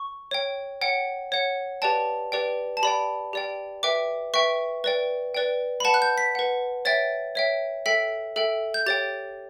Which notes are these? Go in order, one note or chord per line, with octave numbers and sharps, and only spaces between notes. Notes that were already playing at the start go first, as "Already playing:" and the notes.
Already playing: C#6
C#5 G5
C#5 F#5 G5
C#5 F#5
G4 B4 D5 G5 A5
G4 B4 D5 G5
A5
G4 D5 G5 B5
G4 D5 G5
B4 E5 G5 D6
B4 E5 G5 C#6
B4 D5 G5
B4 D5 G5
B5
B4 F#5 A5
F#6
G6
B6
B4 F#5
C#5 E5 G5 A6
C#5 E5 G5
A4 E5 G5 B6
A4 E5 G5
G6
G4 C#5 G5 A6